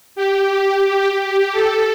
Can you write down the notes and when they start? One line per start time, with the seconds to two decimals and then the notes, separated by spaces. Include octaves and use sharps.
0.16 G4
1.52 A4